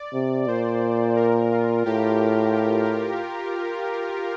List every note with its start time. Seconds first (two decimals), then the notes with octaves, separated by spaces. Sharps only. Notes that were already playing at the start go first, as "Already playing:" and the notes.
Already playing: D5
0.13 C3
0.47 A#2 C5
1.16 A#4
1.52 F4
1.86 A2 G4